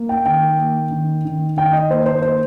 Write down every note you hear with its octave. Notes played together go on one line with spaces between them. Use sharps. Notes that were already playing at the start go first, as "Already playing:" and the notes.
Already playing: A#3
G5
D#3 G5
A#3
D#3
D#3
D#3 G5
D#5
A#3 C5
C5
A#3 C5